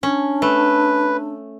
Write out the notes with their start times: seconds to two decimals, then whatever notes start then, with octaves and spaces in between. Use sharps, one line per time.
0.03 C#4 D4
0.42 A3 B4